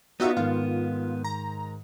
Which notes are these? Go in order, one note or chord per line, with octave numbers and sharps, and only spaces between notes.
B3 D#4 F4 F#4 D5 E5
G#2 D#3 F4
A#5